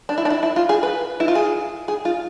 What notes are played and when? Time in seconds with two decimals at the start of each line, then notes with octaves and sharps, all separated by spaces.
0.09 D4
0.18 E4
0.25 D4
0.30 E4
0.43 E4
0.56 F4
0.69 G#4
0.83 B4
1.20 E4
1.28 F4
1.35 G#4
1.88 G#4
2.05 F4